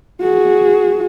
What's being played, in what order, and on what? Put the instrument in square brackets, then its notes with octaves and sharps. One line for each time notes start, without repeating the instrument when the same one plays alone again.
[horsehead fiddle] F#4 G#4